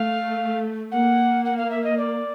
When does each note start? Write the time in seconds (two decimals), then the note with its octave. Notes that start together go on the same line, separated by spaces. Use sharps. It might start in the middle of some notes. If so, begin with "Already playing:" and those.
Already playing: A3 F5
0.92 A#3 F#5
1.45 F#5
1.57 F5
1.70 E5
1.84 D#5
1.97 D5